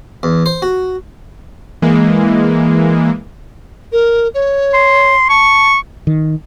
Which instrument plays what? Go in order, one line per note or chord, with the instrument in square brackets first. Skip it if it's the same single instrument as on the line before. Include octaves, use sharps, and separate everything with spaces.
[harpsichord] E2
C5
F#4
[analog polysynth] E3 G#3 A#3
[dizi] A#4
C#5
[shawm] C6
[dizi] A5 [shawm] C#6
[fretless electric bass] D#3